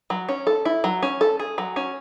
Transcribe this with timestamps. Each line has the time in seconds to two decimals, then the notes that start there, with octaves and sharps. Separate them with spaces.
0.10 F#3
0.29 C#4
0.47 A4
0.65 E4
0.84 F#3
1.02 C#4
1.21 A4
1.39 G#4
1.58 F#3
1.76 C#4